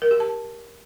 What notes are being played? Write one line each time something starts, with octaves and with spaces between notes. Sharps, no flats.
A#4
G4
A5